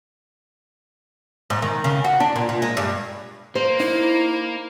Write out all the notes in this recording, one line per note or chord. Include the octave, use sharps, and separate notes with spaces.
G#2
D#3
C#3
F#4
D4
A#2
A#2
G#3
G2
A#3 C5
D#4 E4